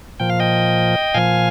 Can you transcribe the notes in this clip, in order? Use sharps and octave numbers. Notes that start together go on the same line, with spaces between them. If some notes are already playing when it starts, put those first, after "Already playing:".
A#2 F3 G5
F5
D#5 G5
A#2 F3 F5 G#5